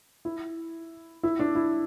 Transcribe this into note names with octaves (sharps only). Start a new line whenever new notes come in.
E4
E4
D4
E4